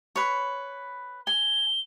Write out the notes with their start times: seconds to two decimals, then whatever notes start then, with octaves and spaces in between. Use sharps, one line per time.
0.16 B4 C#5
1.27 G#5 G7